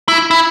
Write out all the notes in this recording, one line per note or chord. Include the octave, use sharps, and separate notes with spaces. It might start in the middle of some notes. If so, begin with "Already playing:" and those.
E4
E4